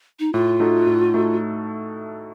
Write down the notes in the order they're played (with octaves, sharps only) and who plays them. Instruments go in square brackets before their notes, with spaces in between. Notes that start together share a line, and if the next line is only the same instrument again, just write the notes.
[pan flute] D#4
[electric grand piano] A2 [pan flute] F4
[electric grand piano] A3 D#4 F#4 A4
A2
A3 D#4 F#4 A4